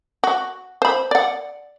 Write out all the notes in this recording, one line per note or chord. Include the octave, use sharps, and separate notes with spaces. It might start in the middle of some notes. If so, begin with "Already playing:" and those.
F#4
C5 B5
D5 F#5